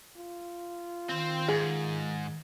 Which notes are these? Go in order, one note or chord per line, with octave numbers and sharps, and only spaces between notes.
F4
D#3 C4 C5
G#2 G#4